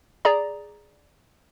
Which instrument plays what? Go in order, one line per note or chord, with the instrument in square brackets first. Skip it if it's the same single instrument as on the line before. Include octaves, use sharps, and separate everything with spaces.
[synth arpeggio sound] G#4 D5 A#5